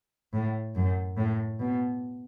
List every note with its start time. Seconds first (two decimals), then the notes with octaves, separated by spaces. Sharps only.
0.33 A2
0.75 F#2
1.17 A2
1.60 B2